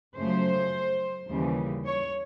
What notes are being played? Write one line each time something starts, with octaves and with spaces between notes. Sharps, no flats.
F#2 C#3 F3 A3 C5
D#2 C#3 E3 G3
C#5